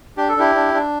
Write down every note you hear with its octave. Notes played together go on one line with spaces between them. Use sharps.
D4 G4
A4
D4 E4 G4
D4
D4